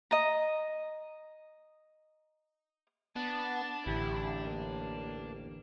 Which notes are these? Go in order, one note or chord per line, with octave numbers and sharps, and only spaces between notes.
D#5 A#5
B3 D4 A5
A1 E2 D3 E4 G4
A#3